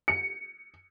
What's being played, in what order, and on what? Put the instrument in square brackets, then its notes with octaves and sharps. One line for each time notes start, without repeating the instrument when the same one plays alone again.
[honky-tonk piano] C#7